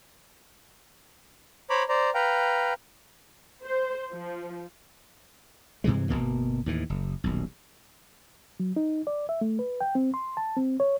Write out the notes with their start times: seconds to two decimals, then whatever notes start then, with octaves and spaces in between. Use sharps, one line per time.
1.70 C5 C#5 A#5 B5 D6
1.89 C5 D5 A#5
2.15 B4 F5 G5 A#5
3.64 C5
4.13 F3
5.84 G2 C3 E3 G#3
6.09 G1 E2 B2 A#3
6.66 D#2 A2 E3
6.90 F#1
7.24 D#1 B1
8.60 F#3
8.76 D#4
9.07 D5
9.29 E5
9.41 A3
9.59 B4
9.81 G5
9.95 C4
10.14 C6
10.37 A5
10.57 C4
10.80 C#5